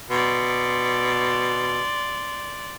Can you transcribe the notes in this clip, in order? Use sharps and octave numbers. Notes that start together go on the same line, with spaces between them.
B2 D5 C6